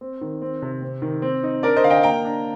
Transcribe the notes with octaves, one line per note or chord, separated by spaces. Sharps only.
C4
D#3
C4
C3
C4
D#3
C4
D#4
D4 A#4 D5
C5 D#5
D3 F5
D#5 G5
A#3 G5 A#5
D4